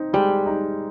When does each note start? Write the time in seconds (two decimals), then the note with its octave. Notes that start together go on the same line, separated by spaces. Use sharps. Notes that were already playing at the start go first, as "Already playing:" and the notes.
Already playing: C4 D#4
0.13 G3 G#3
0.46 D#4